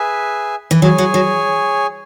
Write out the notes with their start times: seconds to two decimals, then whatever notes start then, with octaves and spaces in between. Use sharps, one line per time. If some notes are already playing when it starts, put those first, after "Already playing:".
Already playing: G#4 B4 E5 G#5
0.71 E3
0.82 F#3 G#4 C#5 G#5
0.98 F#3
1.14 F#3